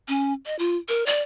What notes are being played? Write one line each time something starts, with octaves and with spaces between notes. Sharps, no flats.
C#4
D#5
F4
A#4
D5